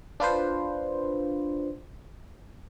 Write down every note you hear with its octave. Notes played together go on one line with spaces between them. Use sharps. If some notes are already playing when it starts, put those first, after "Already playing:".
D4 F4 B4 C5